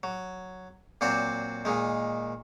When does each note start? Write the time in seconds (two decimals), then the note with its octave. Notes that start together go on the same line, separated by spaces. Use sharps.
0.03 F#3
1.01 A#2 F#3 C4 F#4 C5 D5
1.65 A#2 D#3 G#3